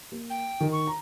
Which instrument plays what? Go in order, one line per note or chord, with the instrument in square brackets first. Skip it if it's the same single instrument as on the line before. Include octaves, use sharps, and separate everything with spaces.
[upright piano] A#3
[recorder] G5
[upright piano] D#3
[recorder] C#6
[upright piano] A#5